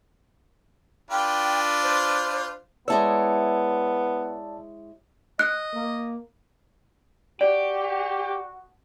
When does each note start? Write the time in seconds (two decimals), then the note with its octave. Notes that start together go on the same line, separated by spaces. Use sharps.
1.11 D4 F4 B4 G5
1.83 C5
2.88 G#3 B3 E4 C#5 D5 A5 E6
5.39 D#5 F#6
5.74 A#3
7.41 F#4 G4 D5